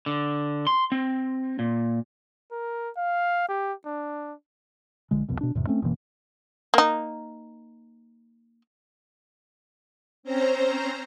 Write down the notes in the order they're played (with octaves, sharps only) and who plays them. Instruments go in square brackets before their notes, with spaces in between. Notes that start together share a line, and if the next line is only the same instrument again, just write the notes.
[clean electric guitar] D3
C6
C4
A#2
[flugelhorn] A#4
F5
G4
D4
[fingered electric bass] A#1 D3 G#3
C2 F2 B2
B2 D4
E2 G#2 C3
A3 C4 C#4
F#1 B2 E3 A#3
[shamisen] A#3 D#4
[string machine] C4 C#4 C5 A#5